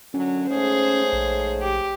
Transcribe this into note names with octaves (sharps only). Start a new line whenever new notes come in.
F#2 D3 F#3 C#4
G#2 A3 G#4 C5 C#5
A#1
G4